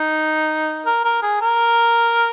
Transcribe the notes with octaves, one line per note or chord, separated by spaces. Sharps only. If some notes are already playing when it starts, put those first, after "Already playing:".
Already playing: D#4
A#4
A#4
G#4
A#4